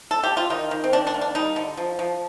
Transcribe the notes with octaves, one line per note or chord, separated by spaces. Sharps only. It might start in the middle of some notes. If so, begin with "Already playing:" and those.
A4
G4
F4
D#3 D#4
D#3
C4
D#3 D4
D4
A#3
D4
G3 D#4
D3
F3
F3